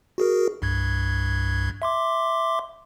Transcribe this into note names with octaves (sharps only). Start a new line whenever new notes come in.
F#4 G#4 A#4
C2 G2 G#6
E5 C6 D6